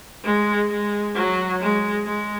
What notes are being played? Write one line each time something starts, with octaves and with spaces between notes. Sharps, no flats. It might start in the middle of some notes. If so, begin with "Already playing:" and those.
G#3
G#3
F#3
G#3
G#3